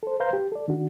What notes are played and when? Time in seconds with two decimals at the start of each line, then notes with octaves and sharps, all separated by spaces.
0.03 A4 C5
0.20 B4 C5 F5 A#5 C6 G6
0.33 G4
0.52 A4 D5
0.68 D#3 D4 F#4